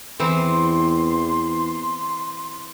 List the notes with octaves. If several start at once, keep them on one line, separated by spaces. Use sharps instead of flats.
E2 E3 C4 C6